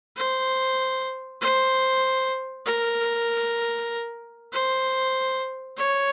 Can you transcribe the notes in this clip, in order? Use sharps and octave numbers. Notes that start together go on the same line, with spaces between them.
C5
C5
A#4
C5
C#5